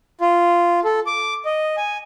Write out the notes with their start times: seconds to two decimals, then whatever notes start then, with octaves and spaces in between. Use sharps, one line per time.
0.21 F4
0.84 A4
1.07 D6
1.45 D#5
1.77 G#5